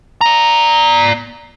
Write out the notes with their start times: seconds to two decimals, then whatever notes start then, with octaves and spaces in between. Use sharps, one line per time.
0.21 D5 A#5